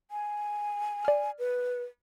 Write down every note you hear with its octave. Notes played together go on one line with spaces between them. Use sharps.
G#5
D5 F6
B4